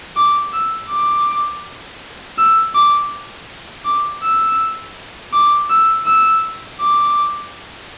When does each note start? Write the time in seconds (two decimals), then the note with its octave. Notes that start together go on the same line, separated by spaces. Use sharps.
0.16 D6
0.53 E6
0.91 D6
2.38 E6
2.75 D6
3.85 D6
4.23 E6
5.33 D6
5.70 E6
6.06 E6
6.81 D6